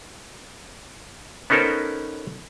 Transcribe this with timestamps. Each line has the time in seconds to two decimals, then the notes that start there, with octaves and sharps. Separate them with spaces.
1.50 B3 C#4 D#4 A4 A#4 C5